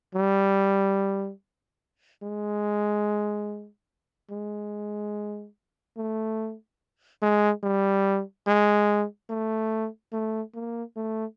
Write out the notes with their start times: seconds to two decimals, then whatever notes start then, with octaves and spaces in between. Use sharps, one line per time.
0.15 G3
2.23 G#3
4.31 G#3
5.97 A3
7.22 G#3
7.63 G3
8.47 G#3
9.30 A3
10.13 A3
10.54 A#3
10.96 A3